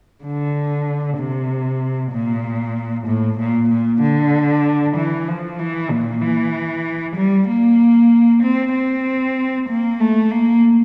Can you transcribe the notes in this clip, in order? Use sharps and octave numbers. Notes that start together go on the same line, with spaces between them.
D3
C3
A#2
A2
A#2
A#2
D3
E3
F3
E3
A#2
E3
G3
A#3
C4
C4
A#3
A3
A#3